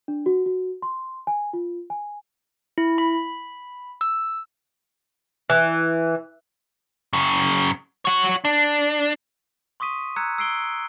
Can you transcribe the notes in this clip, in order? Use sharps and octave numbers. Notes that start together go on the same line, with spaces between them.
D4
F#4
F#4
C6
G#5
F4
G#5
E4
B5
E6
E3
F#2 C#3
F#4 C#5
D4
C6 C#6 D#6 B6 D#7
A#5 E6 F#6 G#6 C#7
E6 C7 D7 G7